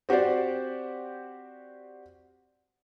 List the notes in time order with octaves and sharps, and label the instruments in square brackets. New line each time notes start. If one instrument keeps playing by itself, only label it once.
[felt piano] C4 F#4 G4 C5 D5